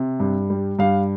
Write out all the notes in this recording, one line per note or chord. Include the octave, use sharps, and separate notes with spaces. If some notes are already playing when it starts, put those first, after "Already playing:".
Already playing: C3
G2
G3
G2 F5